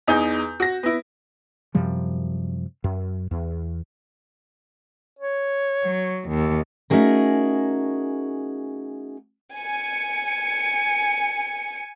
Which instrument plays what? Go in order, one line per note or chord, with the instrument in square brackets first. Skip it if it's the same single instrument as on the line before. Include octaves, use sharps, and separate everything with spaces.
[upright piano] E2 D#4 G#4 G6
F#4 A#6
B3 E4
[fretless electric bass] F#2 C3 F3 G3
F#2
E2
[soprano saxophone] C#5
[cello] F#3
D#2
[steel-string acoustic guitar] A3 C#4 D#4 F#4 G#4 A#4
[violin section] G#5 C#7